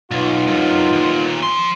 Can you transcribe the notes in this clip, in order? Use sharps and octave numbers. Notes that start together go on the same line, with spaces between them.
B1 B3 D#4 F4
F#2 C3
D#2 A#2
F3 C6